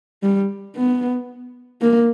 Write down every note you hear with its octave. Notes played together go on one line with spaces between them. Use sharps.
G3
B3
A#3